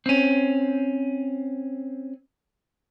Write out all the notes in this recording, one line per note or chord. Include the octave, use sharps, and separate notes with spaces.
C4 C#4